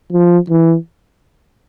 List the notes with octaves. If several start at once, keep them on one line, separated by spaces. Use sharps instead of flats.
F3
E3